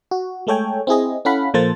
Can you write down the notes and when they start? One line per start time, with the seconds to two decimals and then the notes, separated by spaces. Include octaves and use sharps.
0.11 F#4
0.47 G#3 A3 A4 C#5 G5 G#5
0.87 C4 E4 G#4 D#5
1.25 C#4 E4 A4 F5 F#5 B5
1.54 A#2 F3 A#3 A4 C5 A6